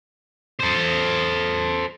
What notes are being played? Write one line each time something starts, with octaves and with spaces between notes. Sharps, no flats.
A4 C5